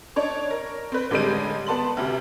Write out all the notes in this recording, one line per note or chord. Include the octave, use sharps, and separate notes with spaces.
D4 D#4 C#5
A#4
C4 B4
A1 D3 G3 G#3 G6 D#7
B3 A5 C6 F#7
D2 C3